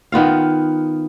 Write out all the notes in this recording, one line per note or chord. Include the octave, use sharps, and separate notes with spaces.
D#3 B3 F4 F5